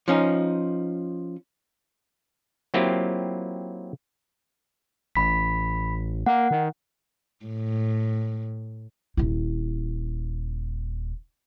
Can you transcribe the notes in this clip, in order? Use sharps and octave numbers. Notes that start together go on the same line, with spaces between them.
F3 C#4 D#4
F#3 A#3 C4 E4 F4 G4
A1 B5 B6
A#3 F#5
D#3
A2
D#1 E4